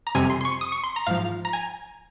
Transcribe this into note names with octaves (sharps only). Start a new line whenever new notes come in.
A#5
F2 C3 G3 G#5
C6
C6
C#6
D#6
C#6
C6
A#5
G#2 F3 F5
A#5
G#5